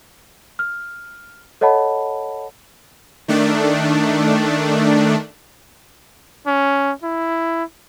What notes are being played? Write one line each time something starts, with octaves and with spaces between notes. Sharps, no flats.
F6
A4 C#5 D#5 F#5 A5 B5
D#3 A3 D4
C#4
E4